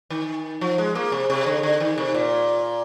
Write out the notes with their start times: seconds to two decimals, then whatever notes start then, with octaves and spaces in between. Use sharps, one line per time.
0.10 D#3
0.61 F3
0.78 G#3
0.95 A#3
1.12 C3
1.30 C3
1.46 D3
1.63 D3
1.80 D#3
1.98 C3
2.14 A#2